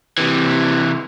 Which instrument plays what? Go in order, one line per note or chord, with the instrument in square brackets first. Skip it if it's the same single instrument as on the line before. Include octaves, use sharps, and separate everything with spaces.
[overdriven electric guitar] C3 E3